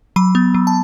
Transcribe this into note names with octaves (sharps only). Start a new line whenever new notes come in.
F#3 B5
B3
F#3
A5